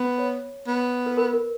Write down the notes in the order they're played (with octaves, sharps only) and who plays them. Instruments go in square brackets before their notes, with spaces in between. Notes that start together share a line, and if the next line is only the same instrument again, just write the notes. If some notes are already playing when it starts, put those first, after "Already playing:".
Already playing: [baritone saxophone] B3
[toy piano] C#5
[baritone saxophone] B3
[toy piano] B4
A#4
A#4